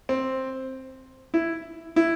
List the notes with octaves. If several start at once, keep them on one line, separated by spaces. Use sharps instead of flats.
C4
E4
E4